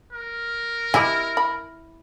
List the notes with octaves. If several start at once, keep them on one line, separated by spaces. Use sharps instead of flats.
A#4
E4 G4 D#5 G#5
B5